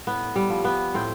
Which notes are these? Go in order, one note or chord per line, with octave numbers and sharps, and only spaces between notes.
A2 B3
G3
F3
B3
A2 C4